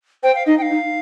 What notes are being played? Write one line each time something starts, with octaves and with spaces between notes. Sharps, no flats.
C5 G5
F5
D#4 D#5
G5
F5
D#4